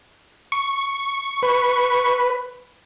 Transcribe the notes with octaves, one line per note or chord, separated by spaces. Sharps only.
C#6
B4